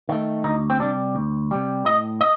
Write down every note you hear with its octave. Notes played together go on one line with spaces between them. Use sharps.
D#3 A3
D2 D#4
C4
C3 G3 D4
D2
C3 G3
A2 D#5
D#5